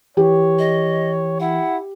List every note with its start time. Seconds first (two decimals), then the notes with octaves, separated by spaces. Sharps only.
0.17 E3 G4 C#5
0.59 D#5
1.40 E4 F#5